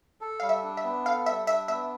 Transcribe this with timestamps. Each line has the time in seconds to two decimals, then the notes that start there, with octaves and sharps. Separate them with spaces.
0.21 A4
0.40 G3 F5
0.49 E5
0.63 D4
0.77 E5
0.84 B3
1.05 A4 F5
1.26 G3 E5
1.47 D4 E5
1.68 B3 E5